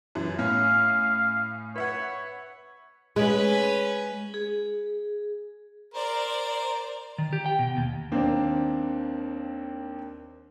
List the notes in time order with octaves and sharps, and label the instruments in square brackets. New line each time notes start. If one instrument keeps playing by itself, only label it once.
[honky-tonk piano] F#2 E3
[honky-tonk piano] A2 C#4 [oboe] F5
[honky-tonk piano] B4 E5 F#5 [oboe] C#5
[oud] G#3 [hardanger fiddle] C#4 B4
[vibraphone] G#4
[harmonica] A#4 [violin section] C5 D5
[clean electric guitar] D#3
G4
G5
B2
D#2
[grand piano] D#2 A#3 C4 D4